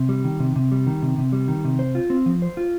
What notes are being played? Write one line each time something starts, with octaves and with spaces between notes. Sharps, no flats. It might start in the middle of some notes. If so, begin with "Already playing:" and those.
Already playing: C3
G3
D#3
C3
C3
G3
D#3
C3
C3
G3
D#3
C3
C5
F4
C4
F3
C5
F4